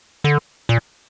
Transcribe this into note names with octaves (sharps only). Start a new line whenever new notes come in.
D3
A#2